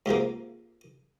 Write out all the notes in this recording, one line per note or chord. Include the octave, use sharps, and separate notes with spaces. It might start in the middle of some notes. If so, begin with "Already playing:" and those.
G#2 C3 F3 A#3